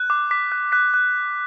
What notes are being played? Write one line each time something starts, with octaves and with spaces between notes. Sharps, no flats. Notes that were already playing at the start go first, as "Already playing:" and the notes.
Already playing: F#6
D6
D6 B6
F#6
F#6 B6
F#6